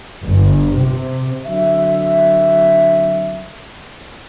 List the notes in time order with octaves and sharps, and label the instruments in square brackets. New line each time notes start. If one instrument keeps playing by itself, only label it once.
[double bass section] G1
C3
[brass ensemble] D3 F#3 C4 E5